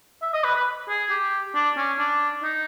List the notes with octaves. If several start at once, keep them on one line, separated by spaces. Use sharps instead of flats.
E5
D#5
B4
B4
G#4
G4
D4
C#4
D4
D#4